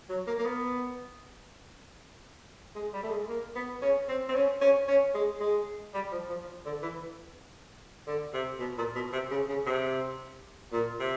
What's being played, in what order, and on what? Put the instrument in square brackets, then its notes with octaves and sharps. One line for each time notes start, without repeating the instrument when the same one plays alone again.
[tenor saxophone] F#3
A#3
A#3
B3
G#3
G3
A3
G#3
A#3
B3
C#4
C4
C4
C#4
C#4
C#4
G#3
G#3
G3
F3
F3
D3
E3
D3
C3
B2
A#2
B2
C3
C#3
C#3
C3
A#2
C3